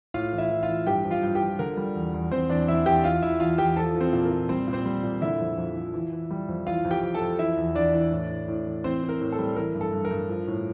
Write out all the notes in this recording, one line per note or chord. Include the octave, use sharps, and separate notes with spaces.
A2 F4 F5
E3
E4 E5
E3
F4 F5
E3
G2 G4 G5
F3
F4 F5
G2
G4 G5
F3
D3 A#4
G3
E2
E2
E2 C4 C5
E2 D4 D5
E2 E4 E5
E2 G4 G5
E3 F4 F5
E2 E4 E5
E2 F4 F5
E2 G4 G5
F3 A4 A5
F3
C4 C5
A#2
A#4
A#2
G3 C4 C5
A#2
C4 C5
G3
A#2
D3 E4 E5
F2
F2
F3
E3
E3
G3
F2
E3 F4 F5
F2
G4 G5
F2
A4 A5
F2
E3 E4 E5
E2
E2 D4 D5
E3
A2
E3
A2
E3
E3 C4 C5
E3
A#4
A2
A4
G3
E3 A#4
G2
A4
G2
A#4
G2
F3
A2